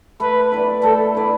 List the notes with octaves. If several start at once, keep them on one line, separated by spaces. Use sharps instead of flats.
A3 B4
E4 B4 D5
A3 A4
E4 B4 D5